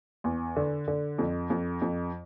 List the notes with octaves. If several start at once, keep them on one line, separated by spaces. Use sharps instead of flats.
E2
D3
D3
F2
F2
F2